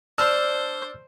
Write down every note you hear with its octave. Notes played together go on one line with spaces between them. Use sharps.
D4 C5 E6 F6